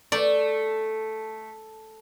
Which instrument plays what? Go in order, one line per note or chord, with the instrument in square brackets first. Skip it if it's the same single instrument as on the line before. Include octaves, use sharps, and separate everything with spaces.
[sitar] A3 [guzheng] D5